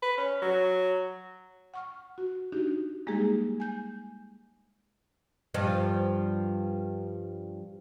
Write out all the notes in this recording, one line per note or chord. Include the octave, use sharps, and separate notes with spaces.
B4
C#4
F#3
F#5 C#6 F6
F#4
D4 D#4 F#4 G4
G3 G#3 A#3 D#4 G4 G#4
G#5 G6
G2 F3